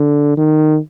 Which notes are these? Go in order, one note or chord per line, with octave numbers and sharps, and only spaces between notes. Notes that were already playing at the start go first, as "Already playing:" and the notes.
Already playing: D3
D#3